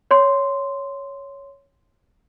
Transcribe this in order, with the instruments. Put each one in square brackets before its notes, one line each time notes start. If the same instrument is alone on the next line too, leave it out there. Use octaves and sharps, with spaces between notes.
[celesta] C#5 C6